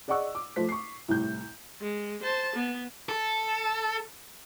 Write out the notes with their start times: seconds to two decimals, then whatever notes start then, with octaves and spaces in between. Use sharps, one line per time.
0.08 G#4 D5 D#5 F#5 C#6 E6
0.35 D6
0.56 F3 A3 C5 B6
0.69 C#6 C7
1.08 C2 A2 G6
1.81 G#3
2.23 C5 A5
2.56 B3
3.09 A4